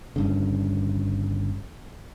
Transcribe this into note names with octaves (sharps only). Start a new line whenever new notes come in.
G1 G2 C#3